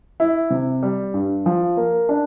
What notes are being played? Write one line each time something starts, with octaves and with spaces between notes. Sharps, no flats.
E4
C3
G3
G2
F3
A#3
D4